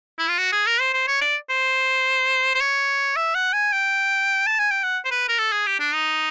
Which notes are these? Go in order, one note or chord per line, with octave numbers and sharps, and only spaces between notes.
E4
F4
F#4
G#4
A#4
C5
C5
C#5
D5
C5
C5
C#5
E5
F#5
G#5
G5
A5
G#5
G5
F#5
C5
B4
A#4
A4
G#4
G4
D4
D#4